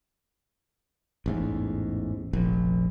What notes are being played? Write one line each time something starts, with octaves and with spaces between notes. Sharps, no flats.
A1 E2 G#2
F1 A#1